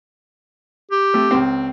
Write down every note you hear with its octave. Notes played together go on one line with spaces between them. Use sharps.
G4
A3 C4
C#2 C4